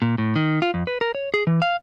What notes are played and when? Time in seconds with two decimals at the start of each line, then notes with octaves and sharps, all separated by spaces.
0.02 A#2
0.18 A2
0.36 D#3
0.62 F4
0.74 F2
0.87 B4
1.01 A#4
1.15 C#5
1.34 G#4
1.47 E3
1.62 F5